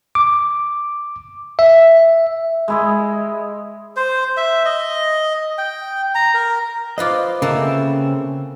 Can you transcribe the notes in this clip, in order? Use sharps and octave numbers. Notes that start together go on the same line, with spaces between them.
D6
E5
G#3 E4 D#5
C5
E5
D#5
G5
A#5
A#4
F4 B4 C5 D#5 D6
C#3 A#3 C4 A4 B4 E5